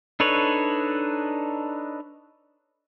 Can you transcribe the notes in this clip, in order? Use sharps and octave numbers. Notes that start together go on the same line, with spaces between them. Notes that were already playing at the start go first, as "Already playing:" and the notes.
D4 D#4 A4 B4 C#5